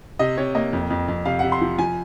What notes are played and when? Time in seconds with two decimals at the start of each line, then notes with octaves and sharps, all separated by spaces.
0.19 C3 D#5
0.37 C3 C#5
0.55 A#3 D#5
0.73 F2
0.90 F2
1.08 F2
1.25 C3 F5
1.39 C3 F#5
1.52 C6
1.61 F3
1.79 F3 G#5